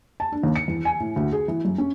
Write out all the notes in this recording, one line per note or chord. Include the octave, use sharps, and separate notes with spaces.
A5
D4
D#2
C#7
E2
G#5
A2
D2
G#4
E3
F#2
C#4